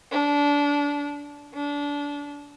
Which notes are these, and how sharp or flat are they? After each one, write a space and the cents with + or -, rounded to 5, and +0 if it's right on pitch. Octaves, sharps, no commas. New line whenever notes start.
D4 -25
D4 -25